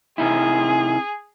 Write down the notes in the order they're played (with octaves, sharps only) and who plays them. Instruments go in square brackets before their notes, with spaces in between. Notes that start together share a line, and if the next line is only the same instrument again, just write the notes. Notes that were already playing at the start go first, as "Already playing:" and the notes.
[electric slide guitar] C3 D#4 E4 [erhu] G#4